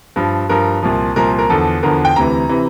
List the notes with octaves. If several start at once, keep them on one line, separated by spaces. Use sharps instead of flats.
G2 F3
G2 F3 A#4
C2 A#2 F3
C2 A#2 F3 A#4
A#4
E2 D3 F3 A4
E2 D3 F3 A#4
G5
D2 C3 E3 A#5
C3 E3